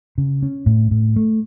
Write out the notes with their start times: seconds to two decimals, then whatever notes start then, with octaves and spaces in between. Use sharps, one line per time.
0.18 C#3
0.42 C#4
0.66 A2
0.91 A2
1.16 A3